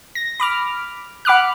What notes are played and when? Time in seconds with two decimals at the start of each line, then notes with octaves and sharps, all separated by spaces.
0.15 A#6
0.40 B5 D6 F6
1.25 F#5 B5 D6 F6 F#6